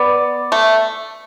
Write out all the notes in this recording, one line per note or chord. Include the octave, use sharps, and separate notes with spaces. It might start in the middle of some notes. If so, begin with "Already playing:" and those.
Already playing: B3 D5
A3